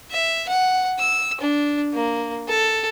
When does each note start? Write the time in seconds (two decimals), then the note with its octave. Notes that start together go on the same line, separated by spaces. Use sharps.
0.11 E5
0.48 F#5
0.99 E6
1.40 D4
1.93 A#3
2.48 A4